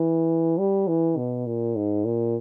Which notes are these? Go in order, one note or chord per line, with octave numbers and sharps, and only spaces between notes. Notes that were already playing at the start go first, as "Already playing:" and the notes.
Already playing: E3
G3
E3
B2
A#2
G#2
A#2